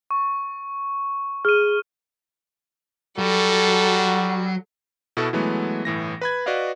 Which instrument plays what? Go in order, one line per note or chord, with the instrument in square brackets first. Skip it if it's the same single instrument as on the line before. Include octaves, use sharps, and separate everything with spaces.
[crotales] C#6
[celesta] G#4 [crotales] F6 D#7
[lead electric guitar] F#3 [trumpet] G3 [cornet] F#4 [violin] A4
[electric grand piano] B2 E4 F#4 A4
E3 F#3 G#3 A3 B3
G1 A2 E3 A#6
B4 B5 G#6
F#4 B4 D5 D#5 F5